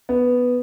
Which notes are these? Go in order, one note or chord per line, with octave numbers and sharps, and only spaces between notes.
B3